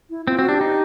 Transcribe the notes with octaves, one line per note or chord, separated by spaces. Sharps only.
E4
C4 F4
C4 F#4
D4 G4
D#4